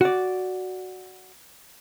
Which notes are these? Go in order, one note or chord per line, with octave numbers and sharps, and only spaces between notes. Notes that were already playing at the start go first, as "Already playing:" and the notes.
F#4 D5